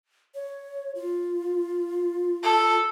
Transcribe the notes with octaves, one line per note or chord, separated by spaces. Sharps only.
C#5
F4
A4